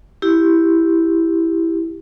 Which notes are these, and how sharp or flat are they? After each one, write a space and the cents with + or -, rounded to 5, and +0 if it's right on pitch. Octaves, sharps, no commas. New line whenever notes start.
E4 +0 G4 +0